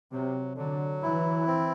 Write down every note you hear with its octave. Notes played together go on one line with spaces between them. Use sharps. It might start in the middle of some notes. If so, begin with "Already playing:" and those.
C3 F#3
D3 F#3
E3 E4
C4